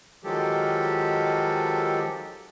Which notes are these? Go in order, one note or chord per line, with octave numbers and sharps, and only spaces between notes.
D#3 F3 F#3 G#3 G4 A4